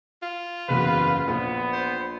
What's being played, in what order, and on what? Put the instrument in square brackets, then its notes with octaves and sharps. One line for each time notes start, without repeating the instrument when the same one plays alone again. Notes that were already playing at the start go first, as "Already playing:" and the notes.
[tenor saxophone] F4
[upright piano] F#1 E2 F#4 [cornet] B4
[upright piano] A#1 [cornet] B3
[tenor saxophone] C5